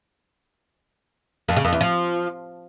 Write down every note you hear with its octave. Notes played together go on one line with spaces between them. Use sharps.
F2
C#3
F2
E2
F3